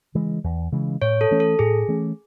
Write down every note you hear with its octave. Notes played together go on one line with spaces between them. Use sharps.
C#3 E3 G#3
E2
C#3 E3 G#3
A2 C#5
A4
E3 A3 C#4
A4
A2 G#4
E3 A3 C#4